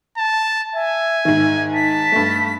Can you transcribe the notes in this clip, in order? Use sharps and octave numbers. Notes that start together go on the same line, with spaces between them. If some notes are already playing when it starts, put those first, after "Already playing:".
A5
E5 G#5
G#2 D#3
A5 B6
G2 A3